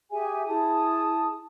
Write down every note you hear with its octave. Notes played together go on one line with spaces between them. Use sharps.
G4 G#4 E5 G#5
E4 G#4 A5 D#6